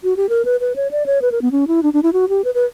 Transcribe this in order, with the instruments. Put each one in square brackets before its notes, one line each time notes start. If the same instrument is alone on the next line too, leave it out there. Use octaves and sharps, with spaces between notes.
[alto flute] F#4
G4
A#4
B4
B4
C#5
D5
C#5
B4
A#4
B3
C#4
E4
D4
D4
E4
F#4
G4
B4
B4